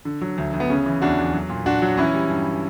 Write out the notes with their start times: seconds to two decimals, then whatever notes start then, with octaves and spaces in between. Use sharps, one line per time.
0.05 D3
0.21 F#3
0.38 D2
0.54 D2
0.60 B3
0.70 C#3 C#4
0.86 E3
1.02 E2 D4 F#4
1.18 E2
1.33 F#3
1.50 A#2
1.66 A#2 D4 F#4
1.82 F#3
1.97 E3 C#4 E4
2.14 G3
2.30 G2